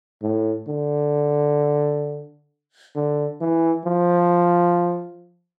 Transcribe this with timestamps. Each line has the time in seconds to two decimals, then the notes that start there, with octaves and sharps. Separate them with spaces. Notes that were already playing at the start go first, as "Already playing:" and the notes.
0.22 A2
0.67 D3
2.95 D3
3.41 E3
3.85 F3